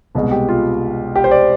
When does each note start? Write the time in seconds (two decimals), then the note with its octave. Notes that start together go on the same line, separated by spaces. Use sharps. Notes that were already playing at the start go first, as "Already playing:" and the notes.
0.15 C2 B2 G#3
0.31 G4
0.49 F4
1.16 G4
1.24 C5
1.31 D5